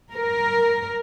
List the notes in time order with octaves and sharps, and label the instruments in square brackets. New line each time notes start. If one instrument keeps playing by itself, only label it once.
[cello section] A#4